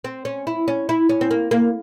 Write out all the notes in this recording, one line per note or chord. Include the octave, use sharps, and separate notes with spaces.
C4
C#4
E4
C#4
E4
C#4
C4
A#3
A#3